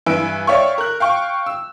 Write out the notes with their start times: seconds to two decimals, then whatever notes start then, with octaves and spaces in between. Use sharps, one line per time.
0.06 G2 E3 B4 G#5 E6 D7
0.47 C#5 D5 E5 F5 G5 C#6
0.78 A#4 F#6
1.00 F5 G5 C#6
1.46 E6